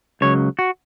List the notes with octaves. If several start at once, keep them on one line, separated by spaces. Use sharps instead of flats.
C#2 C#3 F#3 C#5
F#4